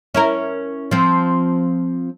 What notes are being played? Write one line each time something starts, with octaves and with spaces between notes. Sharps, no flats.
C#4 E4 A#4
F3 C4